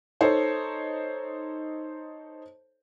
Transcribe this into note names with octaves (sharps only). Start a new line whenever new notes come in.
D#4 A4 C5 C#5